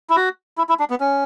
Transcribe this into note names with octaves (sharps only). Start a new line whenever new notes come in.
E4
F#4
E4
E4
D4
B3
C#4